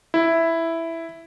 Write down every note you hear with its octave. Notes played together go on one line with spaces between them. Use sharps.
E4